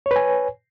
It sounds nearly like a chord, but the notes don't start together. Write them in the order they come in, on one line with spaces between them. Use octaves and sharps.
C#5 B4 G#5